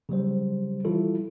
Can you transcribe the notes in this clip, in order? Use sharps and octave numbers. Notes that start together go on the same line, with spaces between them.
C#3 F#3 G3 C5
E3 G3 E4 F4 A4